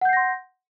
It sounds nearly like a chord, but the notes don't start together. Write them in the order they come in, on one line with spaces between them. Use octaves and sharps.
F#5 G6 C7 A#6 C6